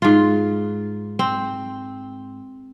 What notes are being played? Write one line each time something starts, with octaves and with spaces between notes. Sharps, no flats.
G#2 F4
C4